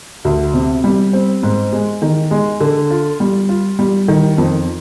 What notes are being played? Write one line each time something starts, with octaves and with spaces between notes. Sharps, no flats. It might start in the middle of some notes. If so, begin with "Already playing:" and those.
D2
C3
G3
C4
G#2
G#3
D#3
G#3
D3
F4
G3
F4
G3
D#3
F2